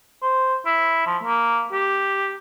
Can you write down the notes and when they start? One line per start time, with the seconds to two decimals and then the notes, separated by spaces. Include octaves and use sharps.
0.23 C5
0.66 E4
1.06 F3
1.24 A#3
1.73 G4